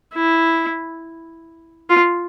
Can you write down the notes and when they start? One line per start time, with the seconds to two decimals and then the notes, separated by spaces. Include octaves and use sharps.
0.14 E4
1.90 F4